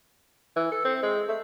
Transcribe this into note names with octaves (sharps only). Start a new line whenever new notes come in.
E3
A4
C4
G#3
A3